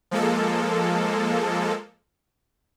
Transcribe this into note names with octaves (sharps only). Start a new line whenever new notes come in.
F3 G#3 A#3 A4